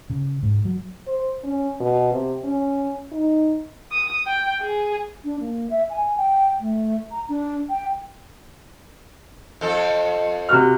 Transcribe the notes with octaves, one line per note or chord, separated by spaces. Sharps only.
C#3
G#2
F#3
C5
C#4
B2
C3
C#4
D#4
D#6
G5
G#4
D4
A#3
E5
G#5
G5
A3
A#5
D4
G5
F2 A4
C3 F#4 F6